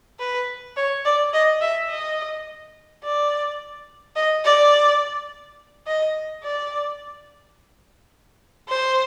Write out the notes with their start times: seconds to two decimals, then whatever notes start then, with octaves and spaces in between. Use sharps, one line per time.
0.20 B4
0.77 C#5
1.05 D5
1.33 D#5
1.61 E5
1.89 D#5
3.04 D5
4.16 D#5
4.45 D5
5.87 D#5
6.43 D5
8.69 C5